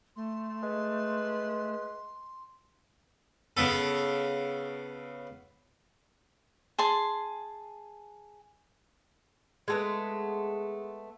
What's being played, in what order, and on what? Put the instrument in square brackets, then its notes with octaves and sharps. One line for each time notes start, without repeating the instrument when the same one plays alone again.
[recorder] A3 [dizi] C6
[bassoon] G#3 [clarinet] B4
[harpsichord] C#3 B3 A4
[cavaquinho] G#4 A5 C6
[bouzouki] G#3 A3 B3